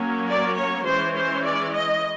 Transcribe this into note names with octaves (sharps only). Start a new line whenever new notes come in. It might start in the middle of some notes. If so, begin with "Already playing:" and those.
Already playing: F#3 A#3 C#4
D5
C#5
E3 G#3 C#4 C5
C5
D5
D#5